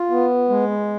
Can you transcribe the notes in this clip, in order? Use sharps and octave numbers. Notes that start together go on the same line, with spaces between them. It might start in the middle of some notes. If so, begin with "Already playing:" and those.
Already playing: F4
B3
G#3